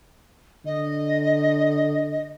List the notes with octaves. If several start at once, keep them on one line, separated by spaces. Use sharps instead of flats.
D3 D#5